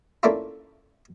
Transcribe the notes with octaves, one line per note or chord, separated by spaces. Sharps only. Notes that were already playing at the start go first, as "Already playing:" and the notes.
A3 A#3 C#4 D4 E4 F4